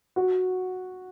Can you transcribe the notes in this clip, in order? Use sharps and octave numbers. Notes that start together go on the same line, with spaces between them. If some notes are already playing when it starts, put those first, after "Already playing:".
F#4